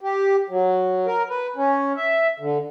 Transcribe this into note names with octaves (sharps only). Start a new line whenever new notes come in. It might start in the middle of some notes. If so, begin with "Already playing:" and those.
G4
F#3
A#4
B4
C#4
E5
D3